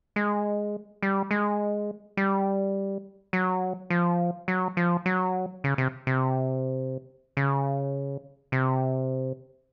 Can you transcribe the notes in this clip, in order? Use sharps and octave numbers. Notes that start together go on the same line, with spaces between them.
G#3
G3
G#3
G3
F#3
F3
F#3
F3
F#3
C#3
C3
C3
C#3
C3